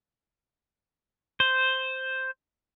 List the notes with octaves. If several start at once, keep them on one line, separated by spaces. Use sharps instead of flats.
C5